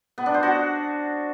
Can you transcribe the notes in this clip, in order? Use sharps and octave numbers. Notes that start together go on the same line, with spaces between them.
B3
D4
C5
F#4